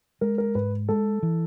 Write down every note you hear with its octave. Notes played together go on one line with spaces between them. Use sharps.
G#3 A#4
A#4
G#2 B4
G#3 A4
E3